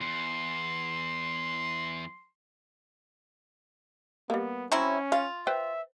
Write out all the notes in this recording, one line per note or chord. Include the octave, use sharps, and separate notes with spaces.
E2 C6
G3 A#3 B3
F#3 C4 C#4 E4
F4 F5
B4 C5 E5 G5